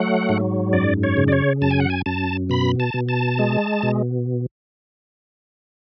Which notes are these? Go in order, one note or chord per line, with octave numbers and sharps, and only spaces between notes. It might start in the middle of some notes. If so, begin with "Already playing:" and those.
Already playing: F#3 A3 F#5
G#2
F#2 D5
C#5
C#3
D5
C#5
F#2 A5
G#5
F#5
G#5
F#2 A5
B2 B5
A5
B2
A5
G#3
B2